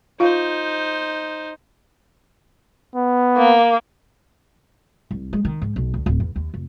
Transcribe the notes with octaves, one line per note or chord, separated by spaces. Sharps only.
D#4 F4 C5 F5
B3
A#3
C2
G#3
D#3
G#2
B1
D2
D1
E2
D#2
F1